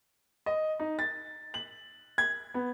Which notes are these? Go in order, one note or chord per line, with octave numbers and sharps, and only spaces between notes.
D#5
D#4
A6
F#7
G#6
B3